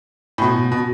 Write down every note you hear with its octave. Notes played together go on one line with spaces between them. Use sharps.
A2
B2
B2